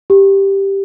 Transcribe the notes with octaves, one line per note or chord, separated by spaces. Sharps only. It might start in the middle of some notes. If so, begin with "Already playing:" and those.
G4